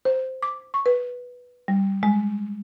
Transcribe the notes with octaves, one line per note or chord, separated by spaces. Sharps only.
C5
D6
C#6
B4
G3
G#3